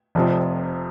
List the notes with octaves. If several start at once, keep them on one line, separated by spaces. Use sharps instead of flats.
F1 F2 C3 F3